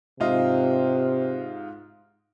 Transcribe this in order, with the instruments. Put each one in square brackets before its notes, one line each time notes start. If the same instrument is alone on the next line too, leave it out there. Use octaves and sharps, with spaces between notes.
[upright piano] G#2 F4 D#5 [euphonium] C3